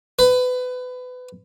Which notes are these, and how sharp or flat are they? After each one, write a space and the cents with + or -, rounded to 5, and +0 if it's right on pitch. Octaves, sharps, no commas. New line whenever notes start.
B4 +25